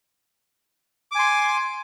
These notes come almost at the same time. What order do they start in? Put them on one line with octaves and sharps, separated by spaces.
D6 G#5 C6